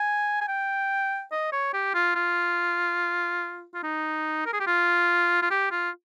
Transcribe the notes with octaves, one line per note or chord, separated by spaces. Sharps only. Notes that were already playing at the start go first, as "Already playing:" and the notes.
Already playing: G#5
G#5
G5
D#5
C#5
G4
F4
F4
F4
D#4
A#4
G#4
G4
F4
F4
G4
F4